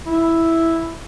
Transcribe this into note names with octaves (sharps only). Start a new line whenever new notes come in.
E4